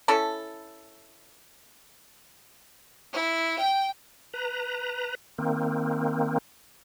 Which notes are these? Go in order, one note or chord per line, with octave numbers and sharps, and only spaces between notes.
C#4 E4 A4
E4
G5
B4 A#5
D#3 A#3 C4